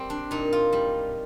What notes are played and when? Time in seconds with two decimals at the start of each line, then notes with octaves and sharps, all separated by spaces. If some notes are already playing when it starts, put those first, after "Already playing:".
Already playing: G3 C4
0.10 D4
0.31 A#2 D#4
0.53 F4
0.72 G3